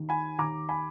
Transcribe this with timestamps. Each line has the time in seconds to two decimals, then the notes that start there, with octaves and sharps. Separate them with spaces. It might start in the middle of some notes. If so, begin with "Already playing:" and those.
Already playing: D#2 D#3
0.09 G#5 B5
0.38 D#2 A#5 D6
0.69 G#5 B5